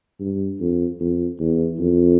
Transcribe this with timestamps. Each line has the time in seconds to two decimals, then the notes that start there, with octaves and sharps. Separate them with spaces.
0.20 G2
0.60 F2
1.00 F2
1.40 E2
1.79 F2